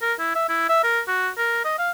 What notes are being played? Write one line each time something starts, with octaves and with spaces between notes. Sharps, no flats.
A#4
E4
E5
E4
E5
A#4
F#4
A#4
D#5
F5